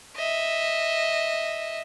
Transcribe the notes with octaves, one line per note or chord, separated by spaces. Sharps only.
D#5 E5